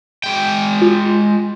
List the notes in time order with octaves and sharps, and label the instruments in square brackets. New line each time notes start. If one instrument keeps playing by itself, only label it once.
[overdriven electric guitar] G#3 G5
[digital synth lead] F4